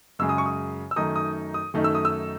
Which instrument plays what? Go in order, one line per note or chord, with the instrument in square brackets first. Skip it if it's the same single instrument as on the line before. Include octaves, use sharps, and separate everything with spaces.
[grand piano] F#2 C#3 G#3 E6
D#6
C#6
D#6
E6
F#2 D#3 A3 D#4 D#6
D#6
D#6
F#2 D#3 A3 D#4
E6
D#6
E6